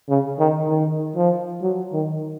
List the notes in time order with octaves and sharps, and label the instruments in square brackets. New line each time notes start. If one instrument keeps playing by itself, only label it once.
[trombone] C#3
D#3
D#3
F3
F#3
D#3